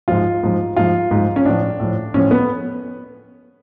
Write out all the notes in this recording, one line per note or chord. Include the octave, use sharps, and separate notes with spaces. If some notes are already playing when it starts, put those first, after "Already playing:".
G#2 F3 F4
G#2 F3
G#2 F3 F4
G#2 F3
C#4
A2 F3 D4
A2 F3
A2 F3 C#4
B3